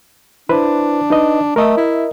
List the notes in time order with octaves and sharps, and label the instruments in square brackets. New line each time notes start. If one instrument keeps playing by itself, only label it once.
[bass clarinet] D4 [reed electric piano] E4 B4 C5
[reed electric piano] D#4 B4 D#5
[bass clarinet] A3 [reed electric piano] A#4 D#5 E5
[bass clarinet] E4